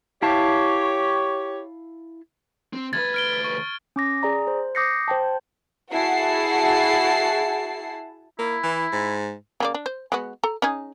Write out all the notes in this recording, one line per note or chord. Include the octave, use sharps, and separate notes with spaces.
E4 G4 C#5 F5 A5
C4
D2 B4 G#6 A6
F6 D7 G7
C#6
C#4 D6 A#6
G#4 D5 A#5
C5
D6 D#6 G6 A#6 C7 C#7
C5 G5 A5
E4 F#4 G#4 F#5 A5 C7
A#3 E4
E3
G#2
C#3 A#3 D5
D4
C5
G#3 B3 F#4
A4 A#5
C#4 D#4 G#4